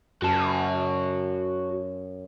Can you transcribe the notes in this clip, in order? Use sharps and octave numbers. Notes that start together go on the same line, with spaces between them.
F#2 F#4 A5